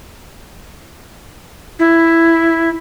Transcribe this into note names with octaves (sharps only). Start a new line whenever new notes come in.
E4